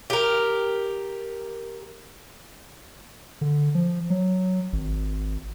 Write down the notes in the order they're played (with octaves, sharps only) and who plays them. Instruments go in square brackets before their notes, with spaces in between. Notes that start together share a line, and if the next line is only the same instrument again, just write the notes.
[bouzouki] G4 A#4
[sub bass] D3
F3
F#3
G#1